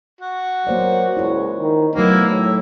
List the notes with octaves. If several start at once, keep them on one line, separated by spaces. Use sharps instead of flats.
F#4
F#3 A#3 C5 D5
C#2 E4 C#5
D#3
B2 F#3 A3 A#3 D#4 E4
A2 E5